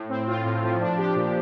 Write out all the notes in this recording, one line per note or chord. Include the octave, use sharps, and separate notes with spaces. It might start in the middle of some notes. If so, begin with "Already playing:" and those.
Already playing: A2
C4
F4
A2
F3
D4
G4
A#2